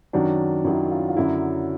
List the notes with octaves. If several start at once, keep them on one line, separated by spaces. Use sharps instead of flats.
F#2 D#3 F#3 D4
F#2 D#3 F#3 E4
F4
F4
F#2 D3 F#3 E4